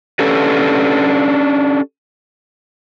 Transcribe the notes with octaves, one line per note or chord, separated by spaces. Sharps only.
C#4 D4 G4 A4 B4